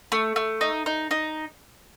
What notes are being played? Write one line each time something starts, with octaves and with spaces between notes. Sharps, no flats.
A3
A3
D#4
D#4
D#4